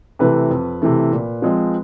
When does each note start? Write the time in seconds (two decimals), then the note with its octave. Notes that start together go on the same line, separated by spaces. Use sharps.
0.19 C3 E3 A3 B4
0.50 F2
0.82 C3 E3 A3
1.12 A#2
1.42 F3 G#3 C4